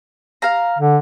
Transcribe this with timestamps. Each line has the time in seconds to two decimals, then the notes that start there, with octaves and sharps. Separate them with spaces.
0.42 F5 A#5
0.79 D3